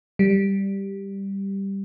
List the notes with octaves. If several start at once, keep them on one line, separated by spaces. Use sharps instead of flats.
G3